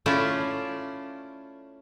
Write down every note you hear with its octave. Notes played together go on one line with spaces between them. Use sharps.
A3 C#4 E4 F4 D5